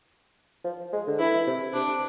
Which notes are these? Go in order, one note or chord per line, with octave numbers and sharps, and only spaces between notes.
F3
G#3
D3
E3 E4
C3
C3 D4